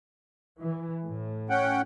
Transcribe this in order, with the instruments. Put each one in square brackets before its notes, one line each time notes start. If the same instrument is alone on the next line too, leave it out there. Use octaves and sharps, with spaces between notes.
[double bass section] E3
A2
[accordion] C#4 F#5 G5